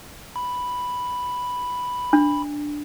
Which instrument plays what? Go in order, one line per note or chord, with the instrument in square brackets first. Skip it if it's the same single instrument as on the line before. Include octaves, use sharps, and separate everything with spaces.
[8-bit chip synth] B5
[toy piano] D4